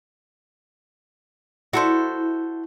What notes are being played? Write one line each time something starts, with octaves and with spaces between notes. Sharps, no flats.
E4 F#4 A4 C5